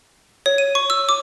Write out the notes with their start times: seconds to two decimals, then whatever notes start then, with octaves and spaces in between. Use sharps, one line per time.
0.46 C#5
0.58 D#7
0.75 C#6
0.90 E6
1.09 D6